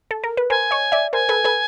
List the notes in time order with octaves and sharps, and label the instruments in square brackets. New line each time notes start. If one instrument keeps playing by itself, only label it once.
[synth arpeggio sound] A4
A#4
B4
[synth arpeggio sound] A#4 C5 [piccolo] G#5
[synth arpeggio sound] C#5 D#5
D5 E5
[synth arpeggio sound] A#4 C5 [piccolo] G#5
[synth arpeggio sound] A4 B4
A4 B4